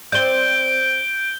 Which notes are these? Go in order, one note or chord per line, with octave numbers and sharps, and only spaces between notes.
C4 D5 G6 D7 G7